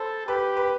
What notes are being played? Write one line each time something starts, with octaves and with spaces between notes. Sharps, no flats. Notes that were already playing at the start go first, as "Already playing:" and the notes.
Already playing: A4 C5 B5
G4 B4
B4